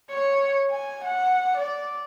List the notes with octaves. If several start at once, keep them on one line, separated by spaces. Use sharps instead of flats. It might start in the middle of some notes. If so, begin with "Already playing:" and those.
C#5
G#5
F#5
D5